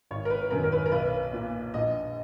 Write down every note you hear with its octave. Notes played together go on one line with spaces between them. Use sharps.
G#1 C#5
A#4
B4
F#2 D#3 A#4
A#4
B4
A#4
B1 B4
A#2
A#1 D#5